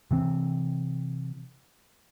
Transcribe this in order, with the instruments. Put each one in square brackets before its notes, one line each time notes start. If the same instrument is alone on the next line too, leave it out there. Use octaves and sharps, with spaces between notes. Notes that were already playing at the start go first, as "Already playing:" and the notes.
[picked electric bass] C3 E3 C4